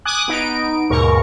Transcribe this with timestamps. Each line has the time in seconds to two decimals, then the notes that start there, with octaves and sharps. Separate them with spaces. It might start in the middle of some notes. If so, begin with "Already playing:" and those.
0.05 G#5 D6 D#6 F#6
0.28 B3 D#4 D7
0.90 D#2 G#2 B2 A#4 C#6